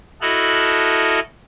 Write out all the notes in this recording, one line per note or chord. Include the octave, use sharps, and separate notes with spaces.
E4 F#4 A4 D#5 F6 F#6